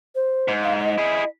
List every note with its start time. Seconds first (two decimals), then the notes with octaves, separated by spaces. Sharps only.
0.15 C5
0.48 G#2
0.63 F5
0.80 D#5
0.98 E4 G#4